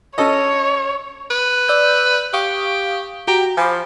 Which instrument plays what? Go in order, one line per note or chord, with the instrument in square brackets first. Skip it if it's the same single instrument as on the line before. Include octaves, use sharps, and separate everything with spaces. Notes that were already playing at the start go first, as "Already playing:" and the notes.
[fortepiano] C#4 A4 D#5 [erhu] C#5
[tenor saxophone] B4
[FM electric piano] D5 E6 G6
[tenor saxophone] G4 [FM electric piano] F5 C#6 D#6
[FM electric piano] F#4 G5 A#5 [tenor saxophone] G4
[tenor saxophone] F3 [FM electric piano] G#5 B5 D6